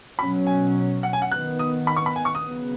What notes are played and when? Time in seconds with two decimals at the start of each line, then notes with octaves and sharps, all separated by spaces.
0.19 B2 F#3 C#4 B5
0.47 G#5
1.03 F#5
1.13 G#5
1.22 F#5
1.31 D#3 B3 F#6
1.59 D#6
1.87 B5
1.96 C#6
2.06 B5
2.16 G#5
2.25 C#6
2.35 D#6
2.44 C#3 F#3 B3